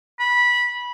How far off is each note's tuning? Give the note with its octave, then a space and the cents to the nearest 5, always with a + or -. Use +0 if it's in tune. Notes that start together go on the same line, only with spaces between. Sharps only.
B5 -15